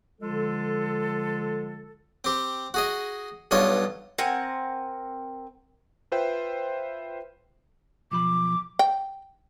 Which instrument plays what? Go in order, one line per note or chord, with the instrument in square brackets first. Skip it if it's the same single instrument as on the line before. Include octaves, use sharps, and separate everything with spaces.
[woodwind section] D3 F3 G#3 F4 A4
[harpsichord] C4 G4
F#4 G#4 D#5
B1 G2 F4 C#5 D#5
[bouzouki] C4 A#4 F#5 G#5
[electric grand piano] F4 B4 C5 E5 G5
[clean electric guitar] B1 F3 B5 [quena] D6
[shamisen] G5